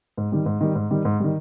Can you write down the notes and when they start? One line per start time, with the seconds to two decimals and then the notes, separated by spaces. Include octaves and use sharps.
0.17 G#2
0.32 D#3 G3
0.46 G#2
0.61 D#3 G3
0.75 G#2
0.91 D#3 G3
1.05 G#2
1.20 D#3 G3